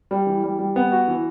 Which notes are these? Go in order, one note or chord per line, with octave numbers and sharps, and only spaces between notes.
G3
E3
G3
G3
B3
F#4
E3